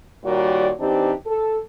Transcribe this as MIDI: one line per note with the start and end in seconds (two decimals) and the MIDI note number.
0.24 0.71 46
0.24 0.71 51
0.24 0.71 55
0.24 0.71 66
0.24 0.71 73
0.24 0.71 74
0.80 1.12 52
0.80 1.12 60
0.80 1.12 62
0.80 1.12 63
0.80 1.12 67
1.26 1.58 69